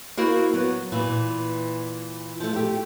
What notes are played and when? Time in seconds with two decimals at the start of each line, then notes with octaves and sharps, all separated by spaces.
0.17 A#3 E4 F#4 A#4 C5 F5
0.53 F#3 B3
0.92 A#2 E3
2.40 F3 A3
2.53 A3 G4